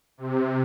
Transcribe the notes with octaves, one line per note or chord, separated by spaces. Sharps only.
C3